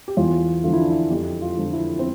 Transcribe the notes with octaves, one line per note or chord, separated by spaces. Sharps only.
G4
E2 F4
D3 F3 F4
E4
D4
E4
F2 G4
F4
D3 F3
E4
C4